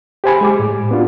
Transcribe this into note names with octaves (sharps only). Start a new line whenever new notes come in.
G4 C5 G#5 B5
G#3 G4 D6
A2
B3 D4 F4 F#4